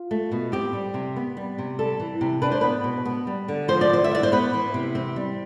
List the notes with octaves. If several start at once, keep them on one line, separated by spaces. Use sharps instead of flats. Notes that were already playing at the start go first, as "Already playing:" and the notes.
Already playing: F4
A3
B2
C4 G4
G3
C3
B3
G3
C3
G3 A4
E3
C3
D4 B4
C5
B3 B4
B2
B3
G3
D3
F3 C5
D5
D3 C5
E5
E2 D5
C5
B3 B4
E3
C3
C4
G3